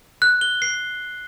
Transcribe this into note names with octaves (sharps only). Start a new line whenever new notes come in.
F#6
G7
C7